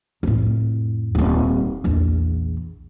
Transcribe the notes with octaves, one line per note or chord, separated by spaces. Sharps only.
F2 A2
D#1 C4
A#1 E2